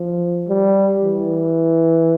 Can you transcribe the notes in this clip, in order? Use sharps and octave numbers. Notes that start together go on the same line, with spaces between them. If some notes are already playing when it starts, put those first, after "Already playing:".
Already playing: F3
G3
E3